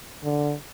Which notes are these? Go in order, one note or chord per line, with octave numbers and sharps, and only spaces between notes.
D3